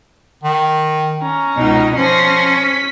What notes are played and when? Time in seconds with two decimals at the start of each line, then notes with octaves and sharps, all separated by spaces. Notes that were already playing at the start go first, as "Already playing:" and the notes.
0.44 D#3
1.22 C#4 A#5
1.57 C#2 B2 D#4
1.97 F3 C#4 A#6 C7
2.58 B6